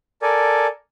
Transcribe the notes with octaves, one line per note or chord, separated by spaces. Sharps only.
A4 A#4 D5 G#5